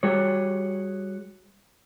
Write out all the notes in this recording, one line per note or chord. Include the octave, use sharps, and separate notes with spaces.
G3 F#4 G#4 C#5